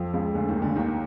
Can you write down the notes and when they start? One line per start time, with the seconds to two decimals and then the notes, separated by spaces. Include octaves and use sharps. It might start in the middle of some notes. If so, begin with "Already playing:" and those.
Already playing: F2 F3
0.14 C#2 C#3
0.34 D2 D3
0.48 D#2 D#3
0.58 D#3
0.62 D2 D3
0.76 D#2 D#3